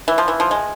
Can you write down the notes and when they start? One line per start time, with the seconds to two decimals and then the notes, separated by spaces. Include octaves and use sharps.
0.08 E3
0.18 F3
0.28 E3
0.40 F3
0.51 G#3